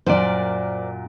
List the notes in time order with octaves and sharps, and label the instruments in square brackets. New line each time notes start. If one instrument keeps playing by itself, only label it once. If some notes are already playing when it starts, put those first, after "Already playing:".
[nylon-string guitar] F#2 A#2 [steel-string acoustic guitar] C5 D5